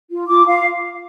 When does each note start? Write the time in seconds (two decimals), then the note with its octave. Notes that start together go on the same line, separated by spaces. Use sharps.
0.10 F4
0.28 F4 D6
0.46 F4 F5